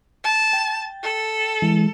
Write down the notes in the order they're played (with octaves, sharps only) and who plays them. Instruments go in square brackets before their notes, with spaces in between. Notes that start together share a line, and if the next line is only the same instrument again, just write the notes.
[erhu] A5
[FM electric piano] G5 A6
[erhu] A4
[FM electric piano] E3 G#3